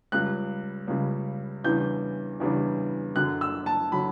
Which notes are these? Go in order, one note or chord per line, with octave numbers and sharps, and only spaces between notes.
C#2 C#3 G3 F#6
C#2 C#3 G3
E2 C#3 E3 G3 D4 G6
E2 C#3 E3 G3 D4
F#2 D3 F#3 F#6
E6
A5
D3 F#3 B5